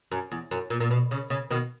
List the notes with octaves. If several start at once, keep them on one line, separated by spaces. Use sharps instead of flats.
F#2
E2
F#2
A#2
A#2
B2
C#3
C#3
B2 D#3